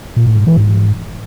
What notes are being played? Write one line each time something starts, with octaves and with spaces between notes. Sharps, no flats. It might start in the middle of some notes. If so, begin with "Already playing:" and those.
A#2
A2
G#2
E3
G#2